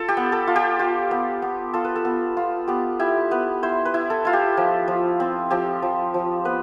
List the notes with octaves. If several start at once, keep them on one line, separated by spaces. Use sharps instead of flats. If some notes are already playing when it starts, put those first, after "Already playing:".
Already playing: F4 A4
G4
B3
A4
F4
G4
F4
B3
B3
F4 A4
B4
A4
B3
F4
B3 G4
E4 G4
B3 B4
E4 C5
B4
E4
A4
E4 F4
G4
F3
F3
C4
F3 G4
F3
F3
B3 B4